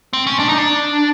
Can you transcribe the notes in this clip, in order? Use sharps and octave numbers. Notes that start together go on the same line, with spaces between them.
C4
C#4
D4
D#4
D4